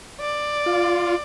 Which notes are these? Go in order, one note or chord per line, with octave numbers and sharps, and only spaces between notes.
D5
F4